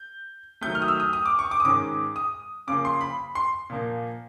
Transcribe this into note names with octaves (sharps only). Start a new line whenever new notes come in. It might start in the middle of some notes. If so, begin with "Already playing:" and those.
Already playing: G6
D#3 F#3 A3 G6
F6
D#6
E6
D#6
D#6
D6
C#6
D6
D#6
G#2 D#3 G#3 C#4 D6
D#6
C#3 F3 A#3 D6
C6
B5
C6
A#2 F3 A#3